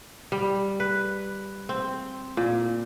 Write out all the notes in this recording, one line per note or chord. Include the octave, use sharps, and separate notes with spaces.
G3
B4
C4
A#2